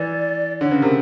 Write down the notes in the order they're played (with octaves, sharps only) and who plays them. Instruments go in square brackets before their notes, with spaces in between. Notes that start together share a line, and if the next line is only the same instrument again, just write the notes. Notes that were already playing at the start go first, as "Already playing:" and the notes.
Already playing: [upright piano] E3 [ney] D5
[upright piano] D3 [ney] C#5
[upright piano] C#3 [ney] B4
[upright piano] C3 [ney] A#4